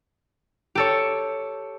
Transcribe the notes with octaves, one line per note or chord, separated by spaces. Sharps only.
G4 A4 C#5